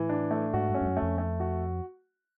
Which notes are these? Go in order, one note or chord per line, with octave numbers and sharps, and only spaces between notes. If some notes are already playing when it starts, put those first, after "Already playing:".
Already playing: A2 E3
D4
A3
G#2 F#4
G2
C#4
G2
F#2
A3
F2
A3
F#4